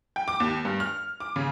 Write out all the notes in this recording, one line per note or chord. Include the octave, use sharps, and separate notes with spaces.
G5
D6
D#2
G2
F6
D6
C#3